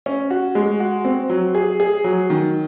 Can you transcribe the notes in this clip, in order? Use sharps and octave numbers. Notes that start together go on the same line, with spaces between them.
C#4
F#4
G#3
F#4
C4
F#3
G#4
G#4
F#3
D#3